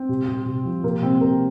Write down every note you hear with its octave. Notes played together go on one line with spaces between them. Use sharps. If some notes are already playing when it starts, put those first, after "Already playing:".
Already playing: C4
C3
C3
C3
F3
C3 A#3
C3 C4
C3 A#4